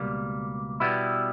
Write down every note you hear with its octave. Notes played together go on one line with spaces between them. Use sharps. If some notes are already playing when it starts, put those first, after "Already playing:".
Already playing: C#2 B2 G3 A#3
B2 G3 B3 E4